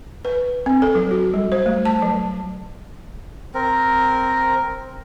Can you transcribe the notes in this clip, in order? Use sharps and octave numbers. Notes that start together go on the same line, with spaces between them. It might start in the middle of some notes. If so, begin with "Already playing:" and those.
B4
C4
A4
F#3
F#4
G3
C5
A3
A5
F#3
C4 A#4